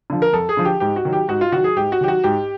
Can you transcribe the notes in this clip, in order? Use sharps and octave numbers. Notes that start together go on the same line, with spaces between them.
D3 F3
A#4
F2 A4
G#4
D3 F3
G4
G#2 G4
F#4
D#3 F#3
G4
G#2 F#4
F4
D#3 F#3 F#4
G#4
G#2 G4
F#4
D#3 F#3 G4
F#4
G#2 G4